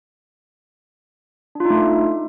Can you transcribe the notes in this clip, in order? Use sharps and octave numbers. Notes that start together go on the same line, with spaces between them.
A3 D4 D#4 F4